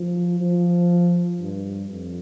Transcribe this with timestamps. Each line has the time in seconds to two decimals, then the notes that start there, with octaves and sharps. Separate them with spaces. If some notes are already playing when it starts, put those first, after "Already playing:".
Already playing: F3
0.41 F3
1.40 G2
1.90 F2